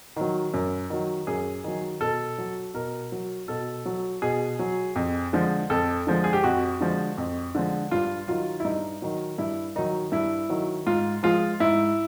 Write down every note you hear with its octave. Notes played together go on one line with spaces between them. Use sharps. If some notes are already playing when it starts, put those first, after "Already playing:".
D#3 F#3
F#2
D#3 F#3
F#2 G#4
D#3 F#3
B2 A4
F#3
B2 A#4
F#3
B2 A4
F#3
B2 G#4
F#3
F2
D3 F3 G#3
F2 A4
D3 F3 G#3
G#4
G4
F2 F#4
D3 F3 G#3
F2
D3 F3 G#3
G2 F4
D#3 F#3 F4
E4
G2 D#4
D#3 F#3
G2 E4
D#3 F#3 D#4
G2 E4
D#3 F#3
G#2 F4
F3 G#3 F4
G#2 E4